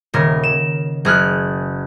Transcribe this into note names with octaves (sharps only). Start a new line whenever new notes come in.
D#1 C#3 A#4
E7
F#1 G#4 F6 F#6